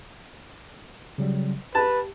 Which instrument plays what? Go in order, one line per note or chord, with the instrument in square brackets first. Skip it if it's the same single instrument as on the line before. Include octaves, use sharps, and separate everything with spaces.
[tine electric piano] C#3 F#3 G3
[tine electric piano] G4 [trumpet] B4 [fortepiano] A5